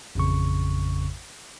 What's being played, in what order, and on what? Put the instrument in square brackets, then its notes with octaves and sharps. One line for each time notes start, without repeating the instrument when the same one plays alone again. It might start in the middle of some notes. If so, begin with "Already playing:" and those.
[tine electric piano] A1 F2 C#3 C#6